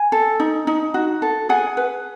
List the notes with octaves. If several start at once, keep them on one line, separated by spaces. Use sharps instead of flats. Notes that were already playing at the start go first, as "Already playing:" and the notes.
Already playing: G#5
A4
D#4
D#4
F#4
A4
G#4 F#5 G#5
B4